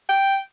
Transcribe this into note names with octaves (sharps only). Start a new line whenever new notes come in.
G5